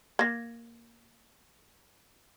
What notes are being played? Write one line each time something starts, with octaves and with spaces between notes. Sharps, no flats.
A#3 G#6 A#6